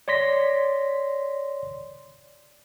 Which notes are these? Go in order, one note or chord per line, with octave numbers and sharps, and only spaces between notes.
C#5 D5 C6 A#6 B6